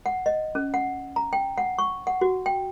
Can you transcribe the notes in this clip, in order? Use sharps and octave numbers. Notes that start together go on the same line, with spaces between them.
F#5
D#5
C#4
F#5
A#5
G5
F#5
C#6
F#5
F#4
G5